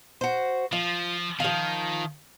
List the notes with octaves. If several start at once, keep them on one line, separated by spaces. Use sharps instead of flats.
F#4 C5
F3 F4
D#3 F3 F5